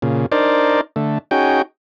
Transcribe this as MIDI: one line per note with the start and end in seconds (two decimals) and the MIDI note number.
0.02 0.26 46
0.02 0.26 49
0.32 0.81 62
0.32 0.81 63
0.32 0.81 70
0.32 0.81 72
0.32 0.81 74
0.96 1.18 50
0.96 1.18 57
1.31 1.62 61
1.31 1.62 63
1.31 1.62 66
1.31 1.62 68
1.31 1.62 79